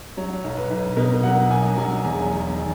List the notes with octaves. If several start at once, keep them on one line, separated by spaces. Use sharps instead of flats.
F#3 C#5
B1
B4
B1
B2 A#4
F#3 F#5
B1 G#5
F#3 G#5
E2
E2
D#3